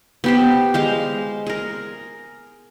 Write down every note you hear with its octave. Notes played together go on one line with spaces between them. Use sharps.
B3 G4 C5
G#3 C5 F5
G#4 A#4